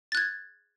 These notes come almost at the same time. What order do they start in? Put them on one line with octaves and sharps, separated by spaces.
A6 F#6 G#6